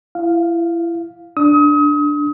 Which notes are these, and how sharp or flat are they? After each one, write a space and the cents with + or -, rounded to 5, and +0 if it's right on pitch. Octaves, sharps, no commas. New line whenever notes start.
E4 +30 F5 +5
D4 +0 D#6 +35